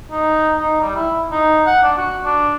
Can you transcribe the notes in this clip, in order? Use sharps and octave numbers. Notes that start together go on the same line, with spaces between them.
D#4
D#4
G3
E4
D#4
F#5
D4
F#4
D4